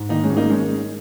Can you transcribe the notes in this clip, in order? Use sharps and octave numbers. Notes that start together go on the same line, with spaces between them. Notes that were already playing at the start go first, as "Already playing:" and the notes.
Already playing: G#2
D#3 A#3 D#4
G#3 C#4
G#1
A#3 D#4
G#3 C#4